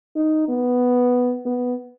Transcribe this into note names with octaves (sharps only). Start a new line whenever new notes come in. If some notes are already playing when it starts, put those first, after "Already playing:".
D#4
B3
B3